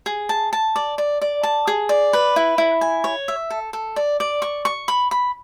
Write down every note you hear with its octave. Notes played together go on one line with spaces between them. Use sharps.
G#4
A5
A5
D5
D5
D5
A5
G#4
D5
B4
E4
E4
G#5
C#5
E5
A4
A4
D5
D5
C#6
C#6
B5
B5